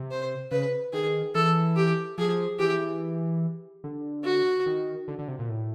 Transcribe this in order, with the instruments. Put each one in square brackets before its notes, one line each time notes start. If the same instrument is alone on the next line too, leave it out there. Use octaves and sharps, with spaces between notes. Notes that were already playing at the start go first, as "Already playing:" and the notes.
Already playing: [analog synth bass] C3
[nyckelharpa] C5
[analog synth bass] C#3 [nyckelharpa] B4
[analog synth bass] D#3 [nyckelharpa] G#4
[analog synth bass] E3 [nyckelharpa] A4
[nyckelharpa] G4
[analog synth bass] F3 [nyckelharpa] G#4
[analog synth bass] E3 [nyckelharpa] G4
[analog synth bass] D3
[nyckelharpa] F#4
[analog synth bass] D#3
D3
D3
C3
A#2
A2